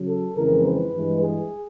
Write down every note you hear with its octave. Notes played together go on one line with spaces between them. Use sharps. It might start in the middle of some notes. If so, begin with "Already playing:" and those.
Already playing: C#3 F#3
A4
F2 C#3 E3 G#3 C4 A#4
B4
G2 E3 G#3
G#4